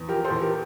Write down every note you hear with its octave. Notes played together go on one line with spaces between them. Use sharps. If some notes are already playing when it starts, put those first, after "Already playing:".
Already playing: E2
F3 G4 A#4
A4 C5
E2
G4 A#4